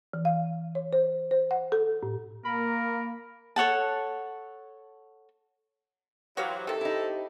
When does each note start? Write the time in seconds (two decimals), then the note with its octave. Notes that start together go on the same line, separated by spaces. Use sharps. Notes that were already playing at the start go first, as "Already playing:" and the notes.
0.13 E3
0.25 F5
0.75 C#5
0.93 C5
1.31 C5
1.51 F#5
1.72 A4
2.03 A2
2.45 A#3 A#4 B5
3.56 A4 C#5 F#5 A5
6.37 E3 F#3 F#4 G4 C5 C#5 F5
6.67 C3 D#3 A4
6.81 D#4 E4